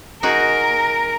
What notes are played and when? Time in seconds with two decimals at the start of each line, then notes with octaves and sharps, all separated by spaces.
0.23 D#4 F#4 G#4 A#4